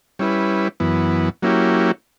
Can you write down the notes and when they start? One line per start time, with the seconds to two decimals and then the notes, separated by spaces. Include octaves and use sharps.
0.19 G3 C#4 E4 B4
0.80 F#2 E3 B3
1.42 F#3 A#3 C#4 E4 G4